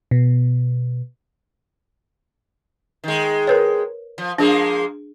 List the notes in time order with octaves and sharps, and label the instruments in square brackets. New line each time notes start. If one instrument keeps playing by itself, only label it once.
[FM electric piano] B2
[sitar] D#3 G#3
[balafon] A#4 B4 C#5
[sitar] F3
[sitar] F3 G#3 A#3 [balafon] D4 G#4